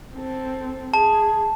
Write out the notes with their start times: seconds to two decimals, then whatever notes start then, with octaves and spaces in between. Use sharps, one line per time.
0.15 C4 A4
0.94 G#4 A5